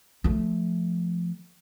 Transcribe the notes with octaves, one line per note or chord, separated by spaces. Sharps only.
F3 A3